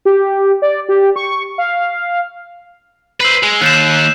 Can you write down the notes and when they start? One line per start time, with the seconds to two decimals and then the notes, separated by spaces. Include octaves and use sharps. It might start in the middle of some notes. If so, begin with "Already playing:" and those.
0.05 G4
0.62 D5
0.89 G4
1.16 C#6
1.58 F5
3.20 B4 C5 E6 C7 F#7
3.43 G#3
3.62 D#2 F#6 G6 E7